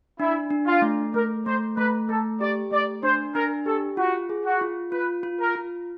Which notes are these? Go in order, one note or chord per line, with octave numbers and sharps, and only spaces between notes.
D4 E4
D4
F4
A3
A3 A#4
A3 C5
A3 B4
A3 A4
G4 D5
A3 D5
D4 C5
D4 A#4
G4 A4
F4 F#4
G#4
F#4
F4
F4 B4
F4
A#4
F4